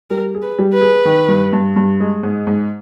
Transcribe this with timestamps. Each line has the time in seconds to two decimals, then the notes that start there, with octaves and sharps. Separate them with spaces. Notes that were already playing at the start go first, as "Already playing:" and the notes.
0.10 G3 A#4
0.35 G#4
0.42 B4
0.59 G3
0.74 B4
0.81 G#4
1.05 D#3
1.28 G2
1.53 G2
1.76 G2
2.00 G#3
2.23 G#2
2.47 G#2